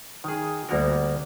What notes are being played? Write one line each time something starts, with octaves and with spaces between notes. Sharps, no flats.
D#3 G#4
D2 G3 A#3 B3 F#4 A#4